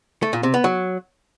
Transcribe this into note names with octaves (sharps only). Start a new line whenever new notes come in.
A3
A#2
C3
B3
F#3